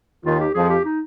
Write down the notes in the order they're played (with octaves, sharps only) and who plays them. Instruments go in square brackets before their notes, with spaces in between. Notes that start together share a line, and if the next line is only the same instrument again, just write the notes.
[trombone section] D#2 D#3 [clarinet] F4
[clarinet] G4
[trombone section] F2 F3 [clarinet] G#4
[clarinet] G4
D#4